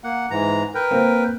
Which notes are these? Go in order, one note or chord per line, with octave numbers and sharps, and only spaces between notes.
A#3 F#5
G#2 E3 A#5
A#4 B4 G5
A#3 C4